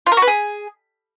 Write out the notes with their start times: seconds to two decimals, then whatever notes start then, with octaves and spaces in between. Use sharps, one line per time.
0.07 F4
0.12 A#4
0.17 F#4
0.22 B4
0.27 G#4